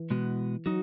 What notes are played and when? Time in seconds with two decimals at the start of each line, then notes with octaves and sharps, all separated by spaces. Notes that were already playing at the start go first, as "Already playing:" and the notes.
Already playing: E3
0.10 B2 G#3 B3 F#4
0.66 F#3 D#4 F#4